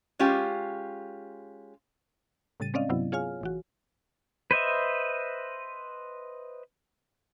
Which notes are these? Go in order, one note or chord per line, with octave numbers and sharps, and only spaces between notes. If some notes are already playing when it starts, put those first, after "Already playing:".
G#3 C#4 F4 G4
A2 C#3 G3 A6 D#7
G#3 C4 C#4 D5 D#5 F5
G2 C3 F#3 B3 E4
F4 G#4 C#5 F5 G#5 F6
A1 E3 F#4
B4 C5 D#5 E5